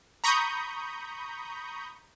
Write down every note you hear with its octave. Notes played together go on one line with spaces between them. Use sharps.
A#5 B5 C#6 D#6 G6